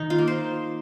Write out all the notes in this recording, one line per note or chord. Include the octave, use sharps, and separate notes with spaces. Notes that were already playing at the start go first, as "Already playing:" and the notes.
Already playing: D#3 D#4
F4
A#3
C5